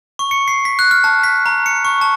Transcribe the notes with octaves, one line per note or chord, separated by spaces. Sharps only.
C#6
C#7
C7
B6
F#6
F6
A5
B6
A#5
C#7
C#6
A5